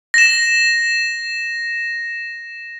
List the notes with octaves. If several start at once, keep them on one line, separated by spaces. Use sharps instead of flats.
A#6 E7